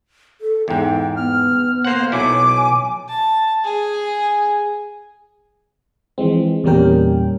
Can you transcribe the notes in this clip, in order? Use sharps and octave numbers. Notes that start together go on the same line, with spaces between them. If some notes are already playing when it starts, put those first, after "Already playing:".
A4
E2 G#2 G5
B3 F6
A#3 C5 F#5
B1 F#3 E4 G#5 D6
A5
G#4
E3 F3 G#3 C4
E2 A#2 G3 C#4 A#4 G5